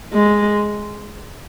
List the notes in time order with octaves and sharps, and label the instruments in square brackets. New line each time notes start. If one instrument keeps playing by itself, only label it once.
[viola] G#3